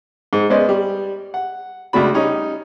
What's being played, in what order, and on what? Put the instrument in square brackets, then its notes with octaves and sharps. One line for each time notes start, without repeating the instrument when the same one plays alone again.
[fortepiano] G#2
G#3 B3 C#4 C5 D5 D#5
G3
F#5
C#2 A3 D4 F#4 B5
G3 C#4 D#4